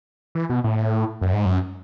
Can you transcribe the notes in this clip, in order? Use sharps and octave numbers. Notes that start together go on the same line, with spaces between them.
E3
B2
A2
F#2
G#2
F#2